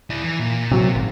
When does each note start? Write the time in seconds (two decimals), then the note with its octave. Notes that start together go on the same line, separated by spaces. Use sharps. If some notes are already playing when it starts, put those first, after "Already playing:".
0.10 E4 D5
0.24 E3
0.39 A#2
0.71 C3 F#3
0.95 G#1